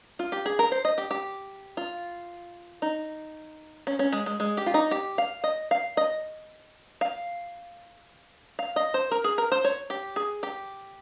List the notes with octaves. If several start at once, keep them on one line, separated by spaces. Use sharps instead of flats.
F4
G4
G#4
A#4
C5
D#5
G4
G4
F4
D#4
C#4
C#4
G#3
G#3
G#3
G4
F4
D#4
G4
F5
D#5
F5
D#5
F5
F5
D#5
C5
A#4
G#4
A#4
C5
C#5
G4
G#4
G4